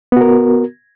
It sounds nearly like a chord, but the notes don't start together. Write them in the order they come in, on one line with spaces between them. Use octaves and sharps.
B3 F#4 A#4